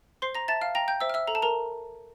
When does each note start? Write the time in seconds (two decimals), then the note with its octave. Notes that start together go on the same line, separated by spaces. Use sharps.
0.22 C5 C6 C7
0.35 A#5 A#6
0.48 E5 A5 A6
0.61 F5 F6
0.75 G5 A#5 A#6
0.88 G5 G6
1.00 C5 E5 E6
1.10 F6
1.14 E5 E6
1.27 A4 A#5
1.35 A5
1.42 A#4 A#5